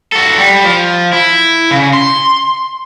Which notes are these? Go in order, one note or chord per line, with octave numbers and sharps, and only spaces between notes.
F#4 A4
G3
F3
E4
C#3
C6